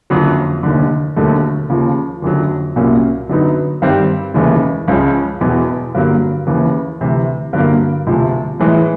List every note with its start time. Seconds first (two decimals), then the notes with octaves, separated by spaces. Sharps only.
0.10 F#1 F2 D3 F#3
0.63 F1 D#2 D3
1.16 E1 D#2 D3 F#3 A3
1.70 D#2 C#3 F3
2.22 F#1 F2 D3 F#3
2.76 C2 A#2 F#3 A#3 C#4
3.29 F#2 D3 F#3 B3 D#4
3.82 G2 D#3 G3 C4
4.34 F1 D#2 C#3 E3 G#3
4.88 C#2 C#3 F3 G#3 C#4
5.41 E1 E2 B2
5.95 G2 D3 F#3 A#3
6.47 D#2 C#3 E3
7.00 D2 C3 E3
7.53 G2 D3 F#3 A#3
8.07 E1 D2 C3 F3
8.59 A2 E3 G#3